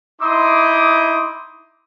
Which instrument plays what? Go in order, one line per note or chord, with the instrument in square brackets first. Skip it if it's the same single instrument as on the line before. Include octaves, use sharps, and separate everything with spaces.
[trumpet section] D#4 E4 C6 D6 D#6